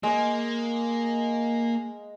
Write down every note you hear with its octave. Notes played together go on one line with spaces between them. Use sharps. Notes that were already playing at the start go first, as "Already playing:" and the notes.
G#3 A#3 D#5